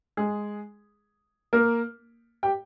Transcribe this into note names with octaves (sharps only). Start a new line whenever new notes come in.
G#3 G#4
A#3 A#4
G4 G5